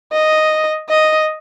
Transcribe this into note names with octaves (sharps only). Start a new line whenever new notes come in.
D#5
D#5